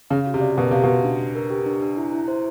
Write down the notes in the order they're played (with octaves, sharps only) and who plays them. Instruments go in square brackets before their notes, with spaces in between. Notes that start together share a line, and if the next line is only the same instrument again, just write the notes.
[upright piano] C#3 [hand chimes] F5
[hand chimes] F#4
[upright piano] C3
[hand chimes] D5
[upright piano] B2 [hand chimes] A#4
[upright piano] C3 [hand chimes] F5
[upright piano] B2 [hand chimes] F#4
[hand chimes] D4
D4
A#4
G4
D4
D4
E4
E4
C5